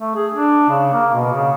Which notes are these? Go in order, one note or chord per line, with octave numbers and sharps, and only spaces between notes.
A3
G#4
D4
C#3
A#3
B2
C#3